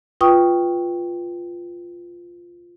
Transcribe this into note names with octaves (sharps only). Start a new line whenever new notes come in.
F4 B4 G5 C#6 D#6